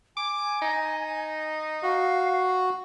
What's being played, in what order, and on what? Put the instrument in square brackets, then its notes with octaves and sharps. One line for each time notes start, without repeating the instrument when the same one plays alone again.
[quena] G#5 [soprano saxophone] D6
[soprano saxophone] D#4
[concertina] F#4 [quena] F5